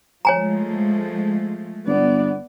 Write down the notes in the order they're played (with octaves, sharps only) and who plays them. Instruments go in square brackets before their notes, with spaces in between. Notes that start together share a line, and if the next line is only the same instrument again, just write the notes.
[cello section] F3 G#3 A3 [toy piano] C#5 G#5 A#5
[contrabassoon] G1 [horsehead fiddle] B3 D5